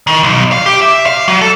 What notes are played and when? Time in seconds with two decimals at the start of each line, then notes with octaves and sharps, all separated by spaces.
0.07 D#3
0.23 B1
0.52 F5
0.66 G4
0.82 E5
1.06 F5
1.28 F#3
1.41 A4